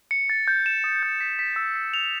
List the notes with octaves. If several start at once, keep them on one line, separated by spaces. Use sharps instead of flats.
C#7
A6
G6
E7
D#6
G6
B6
B6
E6
B6
F7